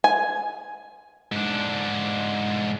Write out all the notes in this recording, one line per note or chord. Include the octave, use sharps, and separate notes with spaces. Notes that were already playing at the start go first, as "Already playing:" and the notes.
G#5
G#2 D4